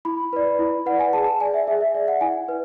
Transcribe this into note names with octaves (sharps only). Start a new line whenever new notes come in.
E4 B5
B4 D5
E4
B4 D5 F#5
G#5
G#4 A5
A5
D5 G#5
E5
G#4 E5
E5
D5 E5
F#5
E4 G#5
B4